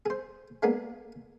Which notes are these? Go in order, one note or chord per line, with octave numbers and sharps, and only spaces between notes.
G#4 C5
G#3 A#3 B3 D4 G#4